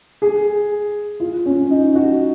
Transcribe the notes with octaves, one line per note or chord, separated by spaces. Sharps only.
G#4
F4
C#4
D#4
F#4